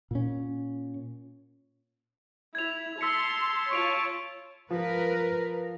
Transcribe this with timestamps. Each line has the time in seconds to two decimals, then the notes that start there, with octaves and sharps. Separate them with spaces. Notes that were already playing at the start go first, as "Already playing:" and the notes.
0.11 A#2 C#4
2.55 E4 G#6 F7
3.01 A5 C6 E6 B6 C#7
3.71 F4 C#5 A5 C#6 D7 F7
4.70 F3 A#4 B4